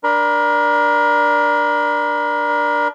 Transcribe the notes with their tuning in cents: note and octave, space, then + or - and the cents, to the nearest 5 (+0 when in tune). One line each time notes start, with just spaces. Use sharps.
D4 +0 A#4 +30 B5 +35